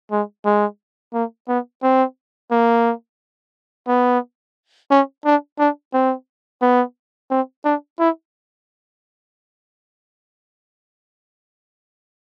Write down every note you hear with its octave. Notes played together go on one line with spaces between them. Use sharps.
G#3
G#3
A#3
B3
C4
A#3
B3
C#4
D4
D4
C4
B3
C4
D4
E4